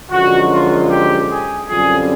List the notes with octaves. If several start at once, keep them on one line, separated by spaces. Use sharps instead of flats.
F#2 D3 F3 G#3 F#4
F4
G4
G#4
F#2 D3 G3 C4 F4 G#4